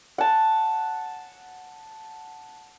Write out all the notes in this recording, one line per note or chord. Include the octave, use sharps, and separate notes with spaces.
F#5 A5